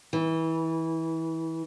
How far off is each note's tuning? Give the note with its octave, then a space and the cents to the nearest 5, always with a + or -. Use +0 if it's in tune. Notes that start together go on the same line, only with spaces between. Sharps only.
E3 -25